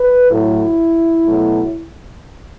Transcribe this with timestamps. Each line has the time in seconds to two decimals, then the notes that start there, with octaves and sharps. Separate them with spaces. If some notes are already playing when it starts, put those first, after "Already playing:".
Already playing: B4
0.31 A2 F#3 A3 E4
1.28 B2 F#3 A3